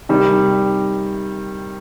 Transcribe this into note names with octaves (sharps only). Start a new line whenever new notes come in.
C3 D#3 G3